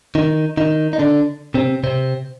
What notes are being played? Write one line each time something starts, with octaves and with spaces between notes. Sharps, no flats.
D#3 D#4
D#3 D#4
D#4
D3 D4
C3 C4
C3 C4